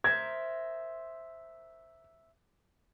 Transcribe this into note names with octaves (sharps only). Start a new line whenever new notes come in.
A#4 C5 E5 G#6